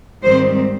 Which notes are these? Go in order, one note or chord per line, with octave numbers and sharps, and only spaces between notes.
G#2 D#3 G3 C4 C5